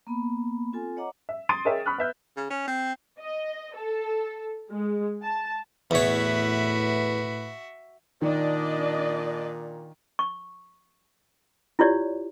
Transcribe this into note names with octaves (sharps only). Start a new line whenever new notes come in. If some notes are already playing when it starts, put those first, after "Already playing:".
A#3 B3 B5
C4 F4 A4 G#5
C#5 D#5 F#5 A#5 D6
E5
C6 D#6 A6 D7 D#7
G#4 A#4 C#5 D#5 E5 G5
B5 C#6 D#6 F6 F#6
B3 E5 G6
C#3
C#4
C4
D#5
A4
G#3
A5
E2 A2 F#4 B4 C#5 E5
A#2 D#3 D4 D5 D#5
C#6
E4 F4 G4 C#5 D5